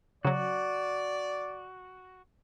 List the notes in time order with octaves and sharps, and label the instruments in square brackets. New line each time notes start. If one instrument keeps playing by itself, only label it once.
[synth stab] C#3 F#3 [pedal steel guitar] F#4 [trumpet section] D5